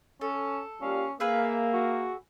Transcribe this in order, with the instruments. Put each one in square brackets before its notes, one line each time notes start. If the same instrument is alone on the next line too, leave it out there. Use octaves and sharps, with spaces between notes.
[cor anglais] C#4 [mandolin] A4
[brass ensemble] A#2 G3 F5 [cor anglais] C#4
[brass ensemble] A#3 [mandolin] G#4 B4 E5 [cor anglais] F5
[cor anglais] F#4